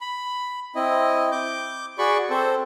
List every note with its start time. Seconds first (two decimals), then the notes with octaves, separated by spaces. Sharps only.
0.01 B5
0.76 C4 E4 D#5
1.32 D6 G6
1.98 F#4 G#4 D5 B5 C#6
2.30 C4 A4 C5